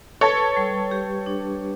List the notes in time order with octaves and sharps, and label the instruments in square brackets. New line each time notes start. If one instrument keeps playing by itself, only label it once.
[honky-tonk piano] A4 C#5 [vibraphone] B4
[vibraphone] G3
G4
D4